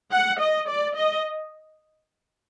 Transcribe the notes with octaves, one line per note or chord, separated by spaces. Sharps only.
F#5
D#5
D5
D#5